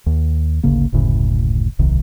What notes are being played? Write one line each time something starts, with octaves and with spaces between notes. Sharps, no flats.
D#2
G#1 D2 C#3 A#3
F#1 D2 A2 C#3
D1 B1 C3 D#3